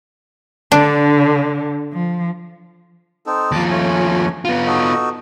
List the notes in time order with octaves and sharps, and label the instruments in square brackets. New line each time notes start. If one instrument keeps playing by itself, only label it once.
[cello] D3 [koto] D4
[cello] F3
[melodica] C4 D#4 A4
[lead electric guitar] D#2 F3 [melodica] A5 D6
[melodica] A3 C#4 G#5
[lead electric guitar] B3 F4
[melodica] D#4 F#4 A4